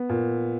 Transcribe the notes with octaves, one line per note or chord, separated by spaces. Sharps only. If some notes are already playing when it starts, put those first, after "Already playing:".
Already playing: B3
A#2